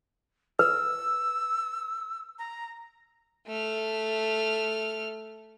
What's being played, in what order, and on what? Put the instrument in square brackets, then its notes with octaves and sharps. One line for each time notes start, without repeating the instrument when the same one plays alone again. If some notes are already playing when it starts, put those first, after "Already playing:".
[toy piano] B4 [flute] E6
[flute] A#5
[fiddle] A3 F6